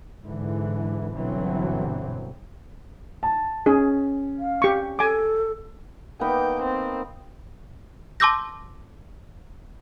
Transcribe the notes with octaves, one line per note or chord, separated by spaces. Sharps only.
G#2 D3 E3
G1 B2 D3 E3 F#3 C4
A5
C#4 G#4
F5
G4 C#6
A4 G#5 D6
A#3 B3 D#4 G5
C4
A5 C6 D6 E6 G6 A#6